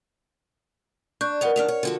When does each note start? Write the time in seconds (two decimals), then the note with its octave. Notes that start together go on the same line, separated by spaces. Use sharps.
1.21 D4 C#6 F#6 G6
1.41 F2 B3 A#4 D#5 F#5 F7
1.56 D#2 D#3 D4 F6 F7
1.68 C#5
1.83 D3 F3 F#4